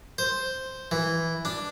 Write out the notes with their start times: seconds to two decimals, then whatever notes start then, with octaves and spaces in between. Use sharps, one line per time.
0.18 C5
0.91 E3
1.45 D4